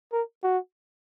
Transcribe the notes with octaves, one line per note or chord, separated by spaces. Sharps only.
A#4
F#4